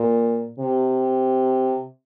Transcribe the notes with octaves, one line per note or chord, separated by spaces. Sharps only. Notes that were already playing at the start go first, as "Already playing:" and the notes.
Already playing: A#2
C3